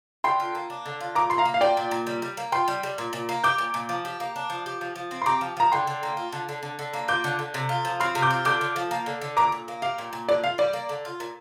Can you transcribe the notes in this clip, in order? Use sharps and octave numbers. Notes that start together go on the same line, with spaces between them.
D3 G5 C6
F4
A#3
D4
D3
F4
A#2 A#5 D6
A#2 C6
F5 A#5
A#3
F5
F4 D5 G5
A#2
A#2
G3
G3
A#3
F4 G5 C6
G3
G3
A#2
A#2
A#3
G4 D6 G6
A#2
A#2
F3
G4
A#3
D4
F3
G4
F3
F3
C4
C6
G4 A#5 D6
F3
F3 A#5
D3 G5 C6
D3
A#3
F4
D3
D3
D3
D3
A#3
F4 D6 G6
D3
D3
C3
F4
F3
C4 C6 F6
C3
D6 G6
F4
D3 D6 G6
D3
F3
A#3
D3
D3
A#2 A#5 D6
A#2
A#3
G4 F5
A#2
A#2
D3 D5
F4 F5
G3 D5
A#3
D3
F4
A#2